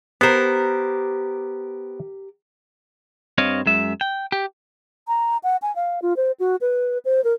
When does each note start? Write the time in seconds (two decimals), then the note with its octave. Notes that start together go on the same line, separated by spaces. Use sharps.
0.21 B3 G4 A#4 C5
3.38 G2 C4 C#5 D#5 F5
3.66 F#2 G#3 E5
4.01 G5
4.32 G4
5.08 A#5
5.43 F#5
5.62 G#5
5.76 F5
6.02 F4
6.17 C5
6.40 F#4
6.61 B4
7.05 C5
7.24 A#4